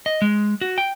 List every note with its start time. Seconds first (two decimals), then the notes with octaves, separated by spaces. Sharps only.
0.06 D#5
0.22 G#3
0.61 F#4
0.78 G5